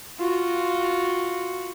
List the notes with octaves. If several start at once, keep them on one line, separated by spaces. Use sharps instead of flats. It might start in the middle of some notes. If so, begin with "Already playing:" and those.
F4 F#4